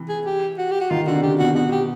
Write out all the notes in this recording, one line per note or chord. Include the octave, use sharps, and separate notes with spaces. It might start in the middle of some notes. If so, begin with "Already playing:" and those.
Already playing: C3 E3
G#4
G4
F#4
G4
F#4
D#3 F4
D3 F#4
C3
C#3 G4
B2 F#4
B2 F#4
G4